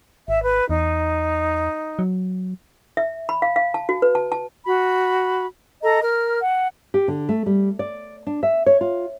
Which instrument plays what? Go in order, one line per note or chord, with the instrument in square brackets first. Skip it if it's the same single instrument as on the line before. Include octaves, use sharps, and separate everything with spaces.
[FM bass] G#1 [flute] E5
[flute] B4
[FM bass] E2 [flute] D#4
[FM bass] F#3
[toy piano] E5
B5
F5
F5
A5
F#4
B4
A5
A5
[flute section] F#4 B5
A4 D#5 A#5
A#4 F6
F#5
[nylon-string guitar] G4
D3
A3
G3
D5
D4
E5
C#5
F4